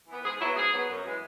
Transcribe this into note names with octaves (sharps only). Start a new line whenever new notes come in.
E3 B3
G#2 G#4
F#3 B3 E4
G#2 G#4
F#3 B3
F#2
E3 G#3 B3